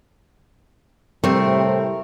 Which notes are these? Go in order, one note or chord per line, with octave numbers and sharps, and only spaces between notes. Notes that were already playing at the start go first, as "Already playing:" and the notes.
A2 C3 G3 A3 C4 A#4